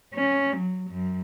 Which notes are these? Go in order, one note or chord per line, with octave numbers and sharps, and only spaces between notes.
C#4
F#3
F#2